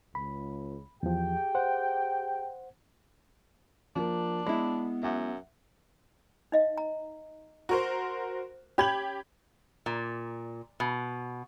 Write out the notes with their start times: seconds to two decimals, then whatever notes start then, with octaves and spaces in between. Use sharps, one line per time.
0.15 C#2 B5
1.03 E2 F3 G4 G#4 G5
1.55 C5 F#5
3.96 F3 A#3 D4
4.47 G#3 B3 E4 B5
5.03 F#2 E5 F#5
6.52 D#4 D#5 F5
6.78 A#5
7.69 F#4 A#4 C5 A#5 C#6
8.78 C#4 G4 C#5 B5 G#6 F#7
9.86 A#2
10.80 B2